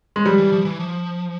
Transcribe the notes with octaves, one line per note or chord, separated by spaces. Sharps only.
G#3
F3 G3
E3
F3
E3
F3